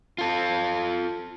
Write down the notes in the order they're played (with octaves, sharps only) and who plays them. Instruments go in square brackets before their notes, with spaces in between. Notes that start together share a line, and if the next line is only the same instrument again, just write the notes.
[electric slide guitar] F4 A4